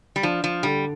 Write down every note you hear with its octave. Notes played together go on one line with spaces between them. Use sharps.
G3
F3 D4
F3
D3 G3